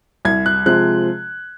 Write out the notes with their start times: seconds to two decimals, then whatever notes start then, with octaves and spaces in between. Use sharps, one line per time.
0.25 C2 G#6
0.46 F#6
0.66 C3 F3 G#3 F#6